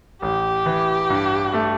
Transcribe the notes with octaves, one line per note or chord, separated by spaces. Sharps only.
A1 G4
E3
G2
A3